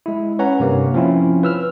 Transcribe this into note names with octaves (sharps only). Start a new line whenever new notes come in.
G#3 E4
C#4 B4 C#5 F#5 A#5
G2 C3 A#3
F3 C4 C#4 E4 F4
B4 E6 F6